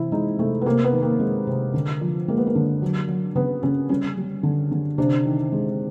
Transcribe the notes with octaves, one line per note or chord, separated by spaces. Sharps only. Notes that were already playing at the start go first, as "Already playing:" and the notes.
Already playing: C3 E3 E4
G#3 D#4
C3 A3
B3
C3 A#3
B3
D#3
A#3
G#3
C3
D3
F3
G#3 A#3
B3
A#3
D3
F#3
F#3
C#3 B3
C#3 C#4
G3 C#4
G3
D3
D3
C3 D4
D#3
G#3